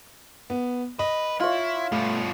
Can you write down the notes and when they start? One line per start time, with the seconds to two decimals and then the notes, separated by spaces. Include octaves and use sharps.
0.50 B3
0.99 B4 D#5
1.40 E4 F4 C#5
1.92 G2 B2 A3